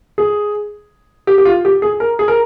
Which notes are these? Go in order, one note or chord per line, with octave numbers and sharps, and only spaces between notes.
G#4
G4
G4
F4
G4
G#4
A#4
G#4
A#4